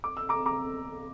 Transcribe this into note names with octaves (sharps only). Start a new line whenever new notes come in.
D6
E6
A#5 D6
A#5 D6